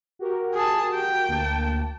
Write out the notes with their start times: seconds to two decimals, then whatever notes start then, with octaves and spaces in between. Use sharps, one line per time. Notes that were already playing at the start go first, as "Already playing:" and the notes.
0.19 F#4 G4 A#4
0.54 G#4 A5
0.94 G5
1.28 D2 A#3 A5